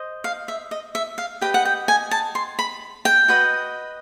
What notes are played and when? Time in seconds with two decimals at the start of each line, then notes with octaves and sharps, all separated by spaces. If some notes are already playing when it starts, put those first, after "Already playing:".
Already playing: C5 D#5
0.24 F5
0.48 E5
0.71 D#5
0.95 E5
1.18 F5
1.41 G4 B4 D#5 G5
1.54 F#5
1.65 G5
1.88 G#5
2.11 A5
2.35 C6
2.59 B5
3.05 G5
3.28 F#4 B4 D#5